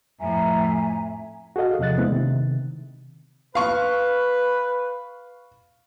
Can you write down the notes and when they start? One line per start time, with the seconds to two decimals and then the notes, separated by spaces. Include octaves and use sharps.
0.20 F2 A2 E5 G#5 A#5
1.56 F#4 G#4 A4 D#5 F5
1.79 E2 C3 F3 D#5 F#6 A6
1.98 G#3 A3 B3 C4 D4 E4
2.11 C3 D#3
3.55 B4 F5 C#6